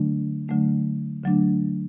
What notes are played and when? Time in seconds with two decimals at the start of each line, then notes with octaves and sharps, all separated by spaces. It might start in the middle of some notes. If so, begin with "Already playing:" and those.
Already playing: D3 F#3 A3 D4
0.48 D3 F#3 A3 D4
1.23 D3 F#3 A3 D4